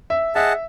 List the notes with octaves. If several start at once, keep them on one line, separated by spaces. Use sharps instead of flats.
E5
G#4 D#5 E5 F#5 A5